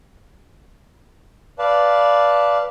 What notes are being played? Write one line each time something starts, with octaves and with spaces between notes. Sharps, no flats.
B4 D5 F5 A5